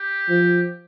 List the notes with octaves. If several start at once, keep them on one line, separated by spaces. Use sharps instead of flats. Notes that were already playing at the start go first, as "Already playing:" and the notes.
Already playing: G4
F3